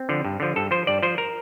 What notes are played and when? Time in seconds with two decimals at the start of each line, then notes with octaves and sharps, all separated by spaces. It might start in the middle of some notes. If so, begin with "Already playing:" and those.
Already playing: C4
0.09 D3 F3
0.25 G2
0.40 D3 F3
0.56 G2 A4
0.71 F3 C5
0.87 G2 D5
1.03 F3 C5
1.18 A#4